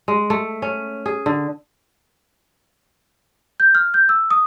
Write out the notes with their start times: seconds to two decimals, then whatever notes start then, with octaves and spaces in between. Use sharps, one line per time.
0.08 G#3
0.30 A3
0.62 C#4
1.06 G#4
1.26 D3
3.60 G6
3.75 F6
3.94 G6
4.09 E6
4.31 D#6